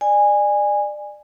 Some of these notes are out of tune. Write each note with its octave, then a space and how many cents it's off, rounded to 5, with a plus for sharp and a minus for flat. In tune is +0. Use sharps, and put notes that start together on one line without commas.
D5 +25 G#5 -15